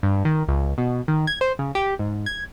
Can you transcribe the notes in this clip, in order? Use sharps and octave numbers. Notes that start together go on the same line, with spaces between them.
G2
D#3
C#2
B2
D#3
G#6
C5
C#3
G4
G#2
G#6